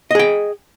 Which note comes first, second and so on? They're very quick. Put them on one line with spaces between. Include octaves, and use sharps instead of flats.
D#5 G#4 G5